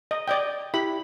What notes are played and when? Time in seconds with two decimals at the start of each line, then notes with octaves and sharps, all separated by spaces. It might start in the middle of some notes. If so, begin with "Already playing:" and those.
0.11 D#5
0.28 D5 D#5 G5
0.74 E4 G4 B5